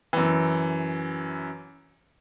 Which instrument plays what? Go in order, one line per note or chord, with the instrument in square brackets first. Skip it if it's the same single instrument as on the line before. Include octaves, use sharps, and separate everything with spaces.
[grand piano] F#2 E3